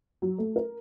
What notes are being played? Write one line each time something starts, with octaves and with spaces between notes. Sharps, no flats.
F#3
A3
A#4